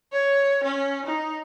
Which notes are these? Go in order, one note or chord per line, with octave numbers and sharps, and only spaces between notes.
C#5
C#4
D#4